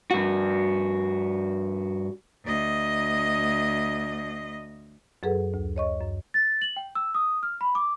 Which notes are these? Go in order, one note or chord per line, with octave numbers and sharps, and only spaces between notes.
G2 F#4
D2 D#5
F#2 F#3 G#4 A4 B4 F#5
D2
C#5 D#5 C#6
F#2
A6
F#7
G5
E6
D#6
F6
B5
D6